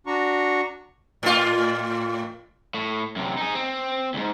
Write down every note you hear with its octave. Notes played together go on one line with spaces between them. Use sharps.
D4 F#4 A#5 C#6
A2 F4
A2
F#2 C3
D#4 G#4
C4
D2 G#2